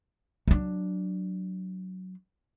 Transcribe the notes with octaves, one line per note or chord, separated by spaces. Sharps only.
F#3 D4